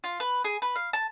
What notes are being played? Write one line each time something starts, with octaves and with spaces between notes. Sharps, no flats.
F4
B4
G#4
B4
F5
A5